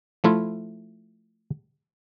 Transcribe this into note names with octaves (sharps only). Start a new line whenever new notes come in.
F3 A3 E4 F4